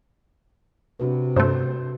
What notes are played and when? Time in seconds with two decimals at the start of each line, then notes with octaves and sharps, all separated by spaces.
1.00 C3 D4 F#4 B4
1.36 G2 A3 C5